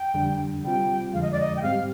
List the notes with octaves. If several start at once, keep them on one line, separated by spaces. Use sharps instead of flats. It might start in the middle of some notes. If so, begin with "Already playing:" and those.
Already playing: G5
F2 D3 G3 D4
C3 G3 C4 F4 G5
F2 D3 F3 G#3 F5
D#5
D5
D#5
G5
G#2 G3 C4 G4 F5